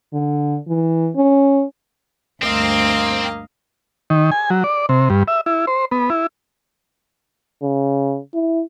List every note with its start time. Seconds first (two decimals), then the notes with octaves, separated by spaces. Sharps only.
0.13 D3
0.68 E3
1.16 C#4
2.42 D2 G2 A#3 C4 D#5 F5
4.10 D#3
4.32 G#5
4.50 F#3
4.64 D5
4.89 C3
5.10 G2
5.28 E5
5.46 E4
5.67 C5
5.91 B3
6.10 E4
7.62 C#3
8.34 E4